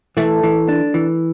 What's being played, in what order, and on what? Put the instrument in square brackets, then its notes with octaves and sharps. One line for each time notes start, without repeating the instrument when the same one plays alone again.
[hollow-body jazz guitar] E3 [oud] A3
[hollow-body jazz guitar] E3
D4
E3